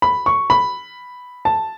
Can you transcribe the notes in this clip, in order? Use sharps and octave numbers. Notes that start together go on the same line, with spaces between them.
B5
C#6
B5
A5